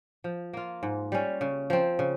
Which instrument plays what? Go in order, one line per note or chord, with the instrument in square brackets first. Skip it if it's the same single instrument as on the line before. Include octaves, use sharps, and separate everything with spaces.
[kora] F3
A#3 F4
G#2
G3 C#4
C#3
F3 C4
C#3